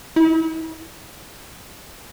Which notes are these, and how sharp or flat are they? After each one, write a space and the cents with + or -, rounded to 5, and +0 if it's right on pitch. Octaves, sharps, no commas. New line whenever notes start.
E4 -40